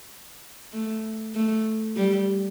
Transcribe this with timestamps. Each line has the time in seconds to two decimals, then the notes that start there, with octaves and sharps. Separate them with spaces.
0.73 A3
1.35 A3
1.96 G3